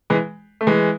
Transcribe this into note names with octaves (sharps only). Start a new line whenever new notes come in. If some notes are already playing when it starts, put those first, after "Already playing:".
E3 G#3
A3
E3 G#3